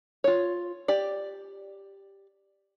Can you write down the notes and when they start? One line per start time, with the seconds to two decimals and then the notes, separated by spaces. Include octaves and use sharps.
0.24 F4 C#5
0.88 G4 D5